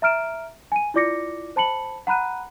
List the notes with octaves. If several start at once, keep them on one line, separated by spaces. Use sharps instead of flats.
E5 A#5 F6 D7 E7
G#5 D#7
E4 F4 D5 D6 A#6 C#7
C5 A5 B5 C#7 F#7
F#5 A#5 B5 F#6 D#7